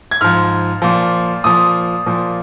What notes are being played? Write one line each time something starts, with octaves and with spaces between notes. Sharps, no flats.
G#6
G#2 F3 F6
A#2 F3
A#2 F3 D#6
A#2 F3